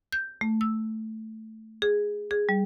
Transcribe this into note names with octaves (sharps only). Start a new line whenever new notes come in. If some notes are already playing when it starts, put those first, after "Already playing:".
G6
A3
E6
G#4
G#4
G3